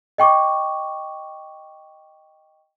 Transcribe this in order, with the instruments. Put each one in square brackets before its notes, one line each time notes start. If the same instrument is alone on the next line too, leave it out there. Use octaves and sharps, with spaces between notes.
[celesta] D#5 G5 C#6 D6